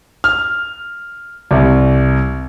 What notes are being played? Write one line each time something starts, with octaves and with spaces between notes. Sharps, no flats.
F6
C2